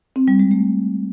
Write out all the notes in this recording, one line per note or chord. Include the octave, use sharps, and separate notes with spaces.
C4
G3
G#3
A3